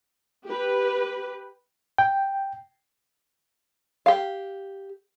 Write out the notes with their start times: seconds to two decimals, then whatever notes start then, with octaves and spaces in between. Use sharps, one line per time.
0.46 G4 B4
1.98 G5
4.06 G4 F5